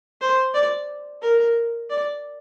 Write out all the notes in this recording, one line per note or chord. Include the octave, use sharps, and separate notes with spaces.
C5
D5
A#4
D5